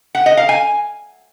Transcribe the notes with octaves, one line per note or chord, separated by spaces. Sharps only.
F#5
D#5
F5
G#5